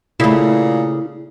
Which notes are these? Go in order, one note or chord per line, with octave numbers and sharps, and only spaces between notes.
A#2 C#3 A3 E4